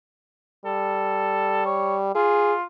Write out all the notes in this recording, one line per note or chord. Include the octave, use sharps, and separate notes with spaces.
G3 A4
C#5
F4 G#4